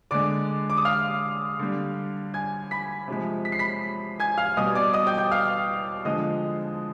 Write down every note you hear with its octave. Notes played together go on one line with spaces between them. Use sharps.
D3 G#3 D5 D6
D6
D#6
F5 F6
D3 G3
G#5 G#6
B5 B6
C3 F3 G#3
B6
C7
B5 B6
G#5 G#6
F5 F6
B2 G3 D#5 D#6
D5 D6
D#5 D#6
G5 G6
G5 G6
F5 F6
D3 F3 G#3 D#5 D#6